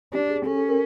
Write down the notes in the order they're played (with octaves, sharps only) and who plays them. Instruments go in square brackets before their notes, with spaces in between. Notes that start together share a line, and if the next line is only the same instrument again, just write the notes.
[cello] D4 [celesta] G4
[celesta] G#4
[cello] C#4 [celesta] A4
[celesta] A4
A#4